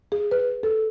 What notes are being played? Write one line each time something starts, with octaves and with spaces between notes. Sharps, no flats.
G#4
B4
A4